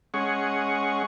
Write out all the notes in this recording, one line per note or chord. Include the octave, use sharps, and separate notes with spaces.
G#3 C#4 G#4 F#5 C#6